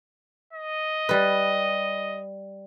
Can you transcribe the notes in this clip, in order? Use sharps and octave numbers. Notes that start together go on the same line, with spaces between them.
D#5
G3 B4